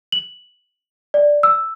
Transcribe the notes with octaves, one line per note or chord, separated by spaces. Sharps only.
F#7
D5
E6